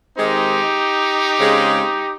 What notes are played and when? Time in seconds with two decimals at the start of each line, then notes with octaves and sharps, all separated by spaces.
0.16 D#3 G#3 C4 D#4 G4
1.39 C#3 G#3 C4